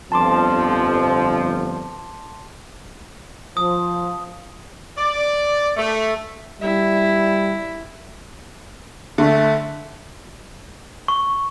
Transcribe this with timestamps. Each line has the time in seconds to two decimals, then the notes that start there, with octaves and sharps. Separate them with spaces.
0.12 G1 F2 F3 A5 C6 D6
3.57 F3 D#6
4.98 D5
5.77 A3
6.62 G3 E4
9.18 D3 A3
11.08 C#6